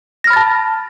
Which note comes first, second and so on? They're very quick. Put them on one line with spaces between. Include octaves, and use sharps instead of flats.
A#6 F6 B5 A6 A5